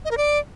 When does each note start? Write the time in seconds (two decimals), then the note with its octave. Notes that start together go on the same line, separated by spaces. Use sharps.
0.05 D#5
0.11 A#4
0.17 D5